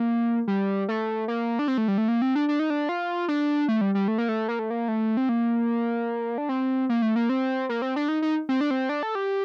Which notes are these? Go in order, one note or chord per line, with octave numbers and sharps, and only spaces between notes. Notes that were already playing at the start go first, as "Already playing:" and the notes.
Already playing: A#3
G3
A3
A#3
D4
C4
A3
G3
A3
A#3
C4
D4
D4
D#4
D4
F4
D4
A3
G3
G3
A3
A#3
A3
A#3
A3
A#3
A3
C4
A#3
D4
C4
A#3
A3
A#3
C4
A#3
C4
D4
D#4
D#4
C4
D4
C4
D4
A4
G4